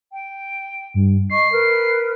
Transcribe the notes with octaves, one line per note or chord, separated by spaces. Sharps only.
G5
G2
D#5 C#6 C7
A#4 B4